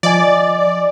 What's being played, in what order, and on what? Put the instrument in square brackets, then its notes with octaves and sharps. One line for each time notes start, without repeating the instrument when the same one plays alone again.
[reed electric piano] F3 D#5 G#5 [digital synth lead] D5